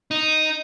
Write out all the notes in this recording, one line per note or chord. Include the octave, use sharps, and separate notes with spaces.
D#4